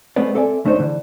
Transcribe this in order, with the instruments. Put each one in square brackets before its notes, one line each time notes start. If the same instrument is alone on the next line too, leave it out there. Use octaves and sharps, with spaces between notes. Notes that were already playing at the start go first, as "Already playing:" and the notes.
[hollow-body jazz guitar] G#3 A3 B3 C4 B4 D5
C4 A4 D5 E5 G#5
D2 A3 D4 D#4 C5 C#5
D3 E3